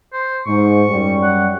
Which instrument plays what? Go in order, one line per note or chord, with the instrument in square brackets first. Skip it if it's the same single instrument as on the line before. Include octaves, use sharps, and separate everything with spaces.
[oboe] C5
[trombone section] G#2 [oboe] C#6
[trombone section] F#2 G3
[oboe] F#5